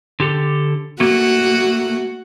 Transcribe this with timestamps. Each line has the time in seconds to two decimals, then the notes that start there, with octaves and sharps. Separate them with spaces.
0.20 D3 G4 A4
1.00 A3 A#3 F#4